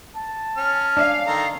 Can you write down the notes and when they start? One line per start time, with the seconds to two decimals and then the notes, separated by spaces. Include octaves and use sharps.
0.16 A5
0.57 C#4 F6
0.97 D4 F5
1.27 D#3 A4 A#5